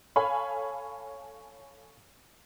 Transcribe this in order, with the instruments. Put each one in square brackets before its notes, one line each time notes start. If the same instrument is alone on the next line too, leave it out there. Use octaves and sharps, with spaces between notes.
[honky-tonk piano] A4 C#5 F5 G#5 B5